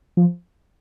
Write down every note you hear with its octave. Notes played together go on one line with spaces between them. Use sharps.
F3